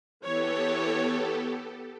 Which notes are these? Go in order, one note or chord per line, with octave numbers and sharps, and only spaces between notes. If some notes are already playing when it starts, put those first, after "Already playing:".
E3 B3 G4 A4 C#5